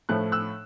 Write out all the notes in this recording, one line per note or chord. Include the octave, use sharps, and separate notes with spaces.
A2 F3 A3 F#6
E6 F#6